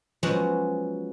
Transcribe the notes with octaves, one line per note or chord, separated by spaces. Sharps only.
F3 F#3 G#3 B3 C#4 F#4